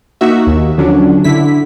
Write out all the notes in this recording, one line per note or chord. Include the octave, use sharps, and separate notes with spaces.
A#3 D#4 F#4 E5
D#2
D3 F3 F#3 C#4 D4
D3 E4 B6